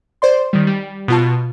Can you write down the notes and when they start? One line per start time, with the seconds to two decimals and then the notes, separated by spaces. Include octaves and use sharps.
0.22 C5 D5 C6
0.53 D#3 G3
0.67 G3
1.08 B2 F4 A5